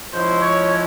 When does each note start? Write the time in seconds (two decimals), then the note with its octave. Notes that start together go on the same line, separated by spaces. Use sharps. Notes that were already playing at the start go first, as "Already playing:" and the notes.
0.12 F3 G#3 C#4 E4 C5
0.42 C#5